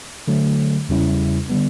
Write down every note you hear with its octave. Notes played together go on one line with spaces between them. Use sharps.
D3 F#3 A3
E2 C#3 G3 C#4 E4
D3 G3 B3